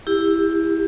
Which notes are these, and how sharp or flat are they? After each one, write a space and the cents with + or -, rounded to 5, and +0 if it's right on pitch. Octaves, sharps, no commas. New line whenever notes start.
E4 +0 G4 +20